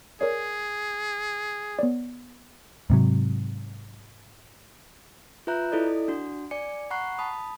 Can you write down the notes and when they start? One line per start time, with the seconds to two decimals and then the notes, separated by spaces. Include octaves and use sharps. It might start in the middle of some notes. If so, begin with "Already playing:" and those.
0.21 G#4 A#4 C#5 D5
1.79 B3 C#5 D5
2.90 G#2 C3 F#3
5.47 F4 B4 E5 A#5 F#6 G6
5.72 E4 A4 D5 D#5
6.08 D4 F#4
6.51 D5 G#5 D6 C#7
6.91 F#5 A#5 B5 C#6 F#6 C7
7.18 A5 B5 D#6